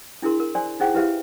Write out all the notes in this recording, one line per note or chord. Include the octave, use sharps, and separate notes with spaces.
D4 E4 G#4 A#4 C6
A#4
C5 D5 G#5 C6
D#4 E4 G#4 C5 F#5 G5
E4 G4 B4 C5 E5 F5